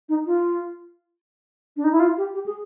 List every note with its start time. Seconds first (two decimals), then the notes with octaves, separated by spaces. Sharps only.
0.09 D#4
0.26 F4
1.77 D4
1.84 D#4
1.92 E4
2.00 F4
2.17 G4
2.34 G4
2.46 G#4